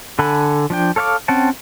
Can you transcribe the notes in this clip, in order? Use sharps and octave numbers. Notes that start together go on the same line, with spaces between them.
D3 A4 F#5 G#5 B5
F3 D4 G5
A4 C#5 F5 G#5 D6
C4 C#4 F#5 G5 A5